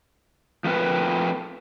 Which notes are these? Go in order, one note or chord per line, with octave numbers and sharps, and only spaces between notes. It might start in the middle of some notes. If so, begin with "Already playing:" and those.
F3 A3 C4 A#4 B4